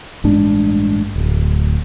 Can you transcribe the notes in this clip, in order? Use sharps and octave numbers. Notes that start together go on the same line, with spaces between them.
A1 G2 G#3 D4
D1